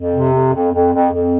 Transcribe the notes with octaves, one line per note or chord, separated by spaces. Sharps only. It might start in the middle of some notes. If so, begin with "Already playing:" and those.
Already playing: F2
C3
F2
F2
F2
F2
F2